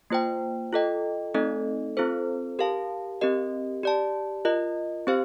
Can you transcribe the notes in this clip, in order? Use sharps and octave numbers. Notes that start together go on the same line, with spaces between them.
A#3 F4 C5 G5
F4 A4 D#5 G5
A3 C4 D#4 A4 D#5
C4 F4 A4 C5
G4 A#4 F5 A5
C4 G4 A#4 D#5
G4 D5 A5
F4 A#4 D#5
C4 G4 C5 F5